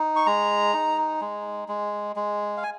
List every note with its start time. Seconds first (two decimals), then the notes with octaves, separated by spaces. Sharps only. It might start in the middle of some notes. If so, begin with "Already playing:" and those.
Already playing: D#4
0.16 C#6
0.26 G#3 A#5
0.73 D#4
1.21 G#3
1.68 G#3
2.16 G#3
2.57 F5
2.63 G#5